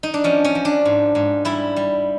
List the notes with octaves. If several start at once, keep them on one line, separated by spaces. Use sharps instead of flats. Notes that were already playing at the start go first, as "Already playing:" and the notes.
D#4
D4
F3 C#4
C#4
F3
D4
G#2
G#2
G3 E4
G3